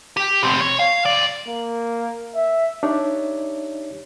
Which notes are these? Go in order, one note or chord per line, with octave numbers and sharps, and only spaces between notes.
G4
B2 C4
C#5
F5
C#2 D5
A#3
E5
D4 D#4 G4 C#5 D5 E5